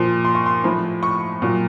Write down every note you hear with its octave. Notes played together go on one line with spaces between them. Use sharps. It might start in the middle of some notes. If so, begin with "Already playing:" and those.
Already playing: A#2 F3 C6
C6
C#6
C6
A2 F3
C#6
A#2 F#3